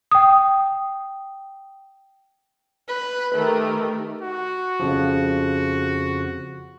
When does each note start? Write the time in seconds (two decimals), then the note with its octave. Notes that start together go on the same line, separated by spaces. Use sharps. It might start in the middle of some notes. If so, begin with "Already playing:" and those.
0.11 G5 D#6
2.89 B4
3.35 D#3 A3 G4 A#4
4.22 F#4
4.80 F2 C#3 F3